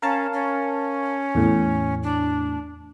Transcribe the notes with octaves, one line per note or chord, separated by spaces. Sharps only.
C#4 A#4 F5 A5
C#4
E2 A2
D4